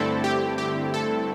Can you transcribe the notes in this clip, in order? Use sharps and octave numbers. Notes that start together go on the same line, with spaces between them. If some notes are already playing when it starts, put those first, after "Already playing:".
Already playing: G2 D3 A3 C4 E4 A4
G4
G4
A4